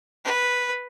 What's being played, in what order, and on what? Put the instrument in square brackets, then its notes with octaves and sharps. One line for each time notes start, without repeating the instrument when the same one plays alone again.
[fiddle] B4